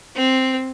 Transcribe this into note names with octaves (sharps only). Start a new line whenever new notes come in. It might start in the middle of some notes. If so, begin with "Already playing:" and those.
C4